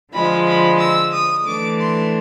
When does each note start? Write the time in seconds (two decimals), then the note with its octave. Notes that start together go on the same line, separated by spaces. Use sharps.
0.13 D3 F3 G#3 B5
0.46 B5
0.80 E6
1.13 D#6
1.46 E3 A3 D4 D6
1.79 C6